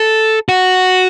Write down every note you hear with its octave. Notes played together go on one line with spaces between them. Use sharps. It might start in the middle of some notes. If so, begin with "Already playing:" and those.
Already playing: A4
F#4